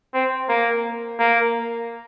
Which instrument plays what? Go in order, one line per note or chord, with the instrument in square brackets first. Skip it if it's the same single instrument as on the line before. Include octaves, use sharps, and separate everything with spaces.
[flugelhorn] C4
A#3
A#3